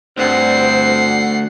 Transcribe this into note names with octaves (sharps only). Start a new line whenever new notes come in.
D2 G2 G3 C4 F#5 C7